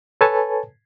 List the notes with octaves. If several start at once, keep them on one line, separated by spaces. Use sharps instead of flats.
A4 B4 C#5 G#5 A5